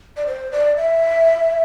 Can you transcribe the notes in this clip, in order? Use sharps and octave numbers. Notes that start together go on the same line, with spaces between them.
D5
C5
D5
E5